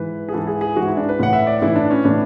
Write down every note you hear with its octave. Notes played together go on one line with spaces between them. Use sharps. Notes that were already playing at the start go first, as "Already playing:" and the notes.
Already playing: G#2 E3 B4
G#4
G#2 E3 A4
G#4
G#4
G#2 E3 F#4
E4
D4
B4
A2 E3 F#5
E5
D5
A2 E3 E4
D4
C#4
A2 E3 D4